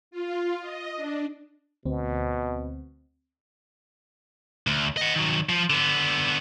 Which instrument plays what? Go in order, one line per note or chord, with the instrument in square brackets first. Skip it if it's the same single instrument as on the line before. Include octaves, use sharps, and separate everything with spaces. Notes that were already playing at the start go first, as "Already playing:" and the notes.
[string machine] F4
D#5
D4
[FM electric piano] D2 C4 [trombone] B2
[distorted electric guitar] D2
D#5 F#5
D#3 F#3
F3
D3 B3